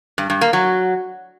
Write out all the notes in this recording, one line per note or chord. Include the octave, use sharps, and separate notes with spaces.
G2
G2
A#3
F#3